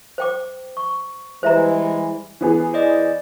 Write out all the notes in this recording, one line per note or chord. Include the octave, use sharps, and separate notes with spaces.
C5 G5 D6
C#6
E3 G3 G#3 C5 E5 A#5
E3 B3 G#4
C5 D5 D#5